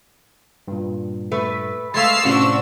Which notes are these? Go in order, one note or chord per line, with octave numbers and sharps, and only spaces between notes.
G2 A#2
A3 B4
G#3 A3 F5 D#6 E6 G#6 A6 C7
A2 C3 C#4 D4 F#4 C5 E6